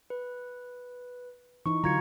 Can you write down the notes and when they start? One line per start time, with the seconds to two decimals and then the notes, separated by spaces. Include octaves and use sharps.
0.10 B4
1.66 E3 D#4 C#6
1.84 D3 F#3 F4 A#5 G#6 C#7